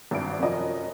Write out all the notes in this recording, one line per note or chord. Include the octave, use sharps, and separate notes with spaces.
G#1 G2 E5 D7
F1 F#2 F3 D#5